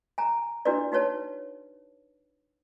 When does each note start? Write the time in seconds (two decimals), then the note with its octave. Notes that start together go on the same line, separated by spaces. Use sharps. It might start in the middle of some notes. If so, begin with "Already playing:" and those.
0.18 G#5 A#5
0.65 D4 E4 F#4 A#4 B4 D5
0.92 D#4 F#4 B4 C#5 A5